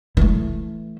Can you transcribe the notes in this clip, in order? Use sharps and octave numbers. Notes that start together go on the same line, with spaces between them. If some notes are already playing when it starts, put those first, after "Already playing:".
E3 A3